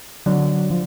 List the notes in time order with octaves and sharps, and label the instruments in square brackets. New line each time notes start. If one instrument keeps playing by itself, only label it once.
[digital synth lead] D3 [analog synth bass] F#3
[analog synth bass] F3